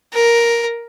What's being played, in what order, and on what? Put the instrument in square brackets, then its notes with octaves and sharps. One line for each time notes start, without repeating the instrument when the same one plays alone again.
[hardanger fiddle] A#4